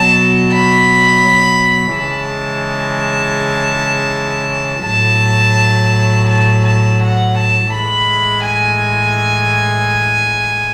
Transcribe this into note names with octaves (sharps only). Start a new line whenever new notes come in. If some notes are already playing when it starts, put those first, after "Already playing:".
Already playing: B2 F#3 A5
B5
C#3 E3 G#3 A5
A2 F#3 A5
A5
A5
F#5
A5
A2 E3 G#3 B5
G#5